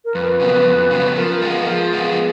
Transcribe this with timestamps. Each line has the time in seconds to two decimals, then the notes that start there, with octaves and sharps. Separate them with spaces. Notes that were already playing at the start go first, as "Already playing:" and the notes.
0.05 A#4
0.15 F2 B4
0.40 C#3 F#3 B3
0.65 F2
0.91 C#3 F#3 B3
1.16 F3 A#4
1.34 A#4
1.41 G#3 B3 F4
1.50 A#4
1.67 F3 G#4
1.93 G#3 B3 F4